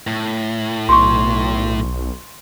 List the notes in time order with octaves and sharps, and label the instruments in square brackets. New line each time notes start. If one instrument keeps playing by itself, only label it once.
[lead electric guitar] A2
[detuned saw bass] B1 [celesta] C6 C#6